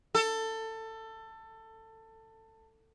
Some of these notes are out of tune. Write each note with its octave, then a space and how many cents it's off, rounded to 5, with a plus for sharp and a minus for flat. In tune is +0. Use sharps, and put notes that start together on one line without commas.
A4 +20